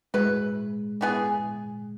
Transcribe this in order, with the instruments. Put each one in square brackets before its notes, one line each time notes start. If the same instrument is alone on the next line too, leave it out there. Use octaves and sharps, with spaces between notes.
[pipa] F#3 E4 B4 [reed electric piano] G#3
[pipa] E3 B3 E4 G#4